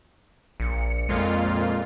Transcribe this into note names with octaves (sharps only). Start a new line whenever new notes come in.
A#1 C#7
F2 A#2 G#3 F4